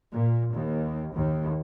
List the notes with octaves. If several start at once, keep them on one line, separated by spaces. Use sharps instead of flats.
A#2
D#2
D#2